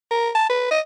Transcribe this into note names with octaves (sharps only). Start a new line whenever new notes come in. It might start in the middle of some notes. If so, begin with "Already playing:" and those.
A#4
A5
B4
D#5